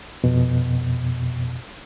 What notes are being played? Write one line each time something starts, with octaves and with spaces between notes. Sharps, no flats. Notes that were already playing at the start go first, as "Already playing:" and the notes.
F2 B2